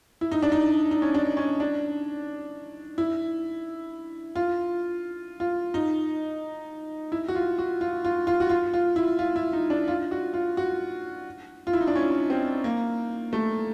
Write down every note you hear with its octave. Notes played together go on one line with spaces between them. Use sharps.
E4
D#4
D4
D#4
D#4
C#4
D4
C#4
D4
E4
F4
F4
D#4
E4
F#4
F4
F#4
F4
F4
F4
F#4
F4
F4
E4
F4
E4
D#4
D4
F4
F#4
F4
F#4
F4
E4
D#4
D4
C#4
C4
A#3
A3